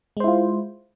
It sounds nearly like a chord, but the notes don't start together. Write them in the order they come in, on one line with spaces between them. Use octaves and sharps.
G#3 C5 E4 F4